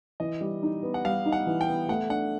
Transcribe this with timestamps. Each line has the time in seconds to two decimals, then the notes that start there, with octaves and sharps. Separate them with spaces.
0.20 E3 D#5
0.41 G3
0.63 D#4
0.83 B3
0.94 F#5
1.05 G3 F5
1.26 D#4
1.32 F#5
1.46 E3
1.61 G5
1.68 B3
1.88 A3 F#5
2.09 D4 F#5